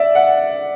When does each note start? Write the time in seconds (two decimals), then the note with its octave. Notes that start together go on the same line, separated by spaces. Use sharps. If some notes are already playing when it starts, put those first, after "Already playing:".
Already playing: D5 E5
0.15 F#5